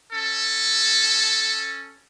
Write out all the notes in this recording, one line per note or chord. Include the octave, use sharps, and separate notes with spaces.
C#4 A4